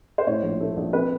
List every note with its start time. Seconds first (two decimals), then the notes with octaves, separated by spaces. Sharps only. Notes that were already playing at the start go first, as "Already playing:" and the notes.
0.18 C5
0.27 A2 C#5
0.43 A#1
0.60 A3
0.77 A#1
0.93 C4 B4